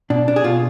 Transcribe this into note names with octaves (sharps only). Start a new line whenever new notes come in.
B2 D4
D4
G#4
B2 F4